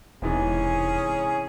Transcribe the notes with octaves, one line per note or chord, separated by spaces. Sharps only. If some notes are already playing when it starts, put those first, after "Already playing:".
E1 G#2 C3 E3 C#4 G#4